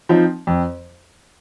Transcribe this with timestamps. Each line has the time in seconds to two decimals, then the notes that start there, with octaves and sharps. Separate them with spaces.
0.09 F3 C4 D#4
0.47 F2